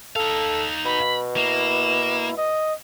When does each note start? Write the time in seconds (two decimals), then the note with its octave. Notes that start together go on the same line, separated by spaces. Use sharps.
0.16 D#4 A4 F5
0.85 B2 B5
1.36 A#3 E4 E7
2.38 D#5